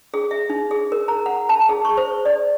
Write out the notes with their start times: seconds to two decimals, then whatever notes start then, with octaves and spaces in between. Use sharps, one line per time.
0.14 G#4
0.31 E5
0.50 D#4
0.71 G#4
0.92 A#4
1.08 A#5
1.26 F#5
1.49 A5
1.69 G#4
1.85 C#6
1.97 C5
2.25 D5